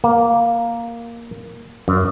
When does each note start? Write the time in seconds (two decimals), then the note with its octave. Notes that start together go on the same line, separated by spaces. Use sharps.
0.04 A#3
1.88 F#2